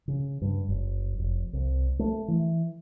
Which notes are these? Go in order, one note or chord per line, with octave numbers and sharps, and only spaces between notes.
C#3
G2
F#1
F1
C2
A3
E3